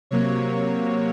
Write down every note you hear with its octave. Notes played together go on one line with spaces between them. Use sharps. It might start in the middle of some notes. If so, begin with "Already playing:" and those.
C3 F#3 A#3 C#5